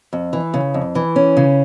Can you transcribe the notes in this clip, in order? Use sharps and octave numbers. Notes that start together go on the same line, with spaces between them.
F2
E3
C#3
F2
E3
C#4
C#3